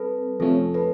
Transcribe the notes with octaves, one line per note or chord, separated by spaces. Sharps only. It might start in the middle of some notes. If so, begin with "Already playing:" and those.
Already playing: G3 C4 A4 B4
F2 C3 F3 A3 C#4 A4
A4 B4